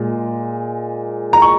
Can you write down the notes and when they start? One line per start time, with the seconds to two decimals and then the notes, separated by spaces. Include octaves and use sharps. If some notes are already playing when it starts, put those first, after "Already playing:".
Already playing: A#2 G#3
1.33 A#5
1.42 C#6